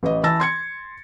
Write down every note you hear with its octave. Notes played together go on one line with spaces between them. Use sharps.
A1 B4 D#5
E3 A5 E6 A6 A#6
C6 G#6 C#7